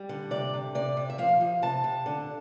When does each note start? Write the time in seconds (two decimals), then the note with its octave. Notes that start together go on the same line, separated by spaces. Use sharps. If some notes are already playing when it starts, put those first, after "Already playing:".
Already playing: G3
0.09 D3
0.31 C3 D5
0.54 C3
0.75 C3 D5
0.97 C3
1.10 E5
1.18 F3 F5
1.41 F3
1.62 C3 A5
1.84 C3
2.06 D3